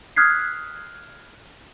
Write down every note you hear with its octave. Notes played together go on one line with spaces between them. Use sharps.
D#6 F6 F#6 G#6 B6 C7